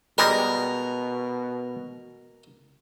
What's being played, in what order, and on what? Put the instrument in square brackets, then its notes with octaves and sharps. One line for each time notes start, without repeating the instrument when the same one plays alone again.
[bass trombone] B2 [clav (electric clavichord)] G3 G#3 [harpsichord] A#4